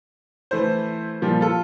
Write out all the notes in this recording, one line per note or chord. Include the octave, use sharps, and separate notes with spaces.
E3 A3 E4 C5
A#2 F3 G3
F4 A4